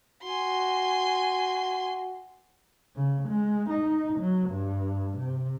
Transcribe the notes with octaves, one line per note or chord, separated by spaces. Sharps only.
F#4 G#5 C6
C#3
G#3
D#4
F#3
G2
C3